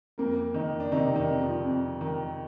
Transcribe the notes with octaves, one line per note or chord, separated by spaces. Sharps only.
F2 A#3 A#4
D#3 D#4
D4
C3 D#3 D#4
D#3 D#4
F2
F3 F4
F2
D#3